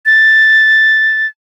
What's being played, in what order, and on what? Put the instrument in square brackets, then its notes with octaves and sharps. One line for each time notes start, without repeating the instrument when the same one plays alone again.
[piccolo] A6